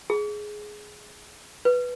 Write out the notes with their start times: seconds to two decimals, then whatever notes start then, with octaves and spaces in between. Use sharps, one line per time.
0.10 G#4
1.65 B4